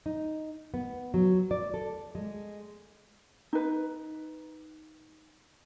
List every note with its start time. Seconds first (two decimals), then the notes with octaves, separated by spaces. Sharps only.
0.06 D#4
0.74 B3
1.14 F#3
1.51 D5
1.74 A4
2.15 G#3
3.53 D#4 B4